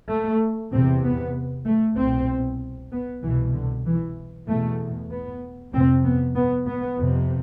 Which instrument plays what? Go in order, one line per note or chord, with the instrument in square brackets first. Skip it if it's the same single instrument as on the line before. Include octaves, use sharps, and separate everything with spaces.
[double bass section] A3
E2 C3 C4
B3
A3
C2 B2 C4
B3
C2 B2 E3
D3
E3
E2 B2 A3
B3
F2 C3 C4
B3
B3
B3
F2 C3